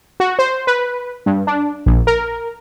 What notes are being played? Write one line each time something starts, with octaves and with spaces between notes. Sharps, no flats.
F#4
C5
B4
G2
D4
A#1
A#4